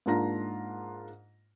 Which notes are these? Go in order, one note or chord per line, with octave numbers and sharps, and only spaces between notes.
G#2 A#3 D4 F4 A#5 A#6